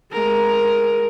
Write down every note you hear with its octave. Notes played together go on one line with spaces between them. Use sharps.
G#3 A#4